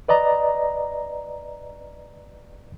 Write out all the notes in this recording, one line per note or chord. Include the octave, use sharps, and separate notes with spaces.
B4 D5 D#5 A#5